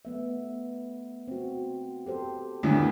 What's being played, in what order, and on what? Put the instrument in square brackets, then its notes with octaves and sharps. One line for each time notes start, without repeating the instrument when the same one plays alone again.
[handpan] A3 B3 E5
C4 F#4
G4 A4 C5
[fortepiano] D2 A2 D3 [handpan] D#3 G3 B3